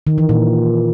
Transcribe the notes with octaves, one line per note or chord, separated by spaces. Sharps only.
D#3
E3
A#2